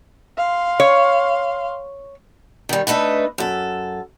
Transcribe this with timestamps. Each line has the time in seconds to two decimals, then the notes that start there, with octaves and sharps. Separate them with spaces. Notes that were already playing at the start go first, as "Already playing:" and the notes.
0.38 F5 C6
0.80 C#5
2.69 D#3 G3
2.87 A3 D4 D#4 B4
3.38 F#2 A4